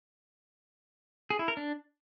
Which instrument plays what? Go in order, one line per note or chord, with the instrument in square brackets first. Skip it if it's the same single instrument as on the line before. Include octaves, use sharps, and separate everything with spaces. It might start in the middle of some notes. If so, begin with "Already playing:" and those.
[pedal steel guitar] G#4
E4
A#4
D4